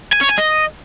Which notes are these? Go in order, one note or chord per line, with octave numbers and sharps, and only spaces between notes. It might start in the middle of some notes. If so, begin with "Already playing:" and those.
G#5
C#5
G#5
D#5